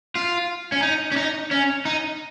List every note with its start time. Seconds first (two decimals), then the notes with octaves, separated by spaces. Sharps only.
0.15 F4
0.72 C#4
0.82 D#4
1.12 C#4
1.16 D#4
1.51 C#4
1.85 D#4